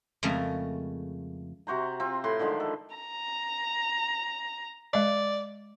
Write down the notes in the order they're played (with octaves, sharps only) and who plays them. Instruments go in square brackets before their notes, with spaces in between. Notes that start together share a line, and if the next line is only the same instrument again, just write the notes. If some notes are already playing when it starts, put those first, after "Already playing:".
[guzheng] F2 C#3 G#3 A3 A#4 A#5
[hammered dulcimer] C3 F#4 C5 A#5
C4 F4
A2 B4 C6
D3 D#3 F3 G#3
A4
[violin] A#5
[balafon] G#3 D#5 [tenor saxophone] D5